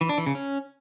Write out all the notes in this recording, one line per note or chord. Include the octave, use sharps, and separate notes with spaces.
E3
D4
E3
C#3
C#4